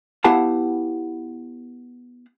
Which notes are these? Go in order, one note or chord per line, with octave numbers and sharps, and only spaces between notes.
B3 E4 G4 F5 F#5 A5